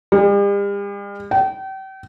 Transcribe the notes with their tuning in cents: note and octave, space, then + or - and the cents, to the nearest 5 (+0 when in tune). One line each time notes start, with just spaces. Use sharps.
G3 +45
G5 -35